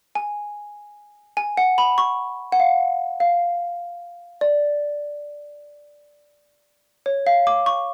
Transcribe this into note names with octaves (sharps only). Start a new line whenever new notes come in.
G#5
G#5
F#5
B5
C#6
F#5
F5
F5
D5
C#5
F5
D6
C#6